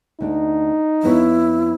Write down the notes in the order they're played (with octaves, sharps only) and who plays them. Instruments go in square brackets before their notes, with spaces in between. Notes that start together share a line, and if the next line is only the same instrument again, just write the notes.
[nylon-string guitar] D2 D4 [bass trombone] D#4
[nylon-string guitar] F2 B3 C#5 [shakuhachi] E4